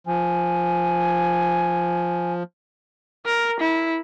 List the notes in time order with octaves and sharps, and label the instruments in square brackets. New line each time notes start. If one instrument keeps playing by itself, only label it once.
[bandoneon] F3 [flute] G#5
[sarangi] A#4
E4